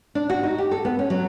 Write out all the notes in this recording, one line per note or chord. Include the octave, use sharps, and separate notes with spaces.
D4
F#4
D#4
G4
A4
B3
C#4
F#3